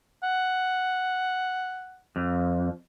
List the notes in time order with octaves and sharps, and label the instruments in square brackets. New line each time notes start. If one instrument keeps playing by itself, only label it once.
[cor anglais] F#5
[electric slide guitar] F2